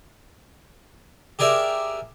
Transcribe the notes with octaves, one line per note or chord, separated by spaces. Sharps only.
G4 G#4 A#4 D5 E5